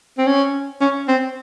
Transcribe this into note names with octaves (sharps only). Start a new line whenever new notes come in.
C4
C#4
C#4
C4